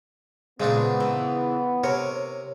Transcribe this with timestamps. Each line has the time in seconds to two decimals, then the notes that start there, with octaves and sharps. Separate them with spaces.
0.60 A#2 C#3 G#3 B3 C4 D4
1.00 E3
1.84 C3 A#4 C#5